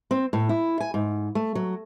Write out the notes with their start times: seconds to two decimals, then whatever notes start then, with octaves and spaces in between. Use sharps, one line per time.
0.11 C4
0.33 A2
0.49 E4
0.80 G#5
0.94 G#2
1.35 A3
1.55 F#3